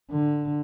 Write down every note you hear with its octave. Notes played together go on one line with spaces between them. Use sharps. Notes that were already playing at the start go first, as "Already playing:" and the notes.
D3